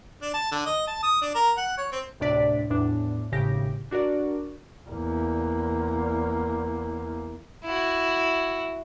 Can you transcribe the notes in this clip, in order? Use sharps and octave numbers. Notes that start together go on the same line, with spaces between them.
D4
A5
D3
D#5
A5
D#6
D4
A#4
F#5
C#5
C4
D2 A2 C3 D4 D5 B6
E2 A2 D4
G#1 A2 C#3 G4 A#6 D7
D4 F#4 A#4 D5
E2 A#3
E4 F#4